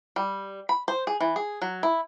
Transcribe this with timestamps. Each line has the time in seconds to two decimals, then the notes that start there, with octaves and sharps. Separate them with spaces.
0.16 G3
0.69 B5
0.88 C5
1.07 G#4
1.21 E3
1.36 G#4
1.62 F#3
1.83 E4